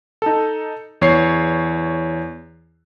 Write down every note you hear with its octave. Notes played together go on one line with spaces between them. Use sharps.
D#4 A4
E2 C#5 C7